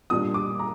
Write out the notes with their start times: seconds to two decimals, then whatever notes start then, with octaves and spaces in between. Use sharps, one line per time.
0.10 A#2 G3 D4 D#6
0.34 D6
0.59 A#5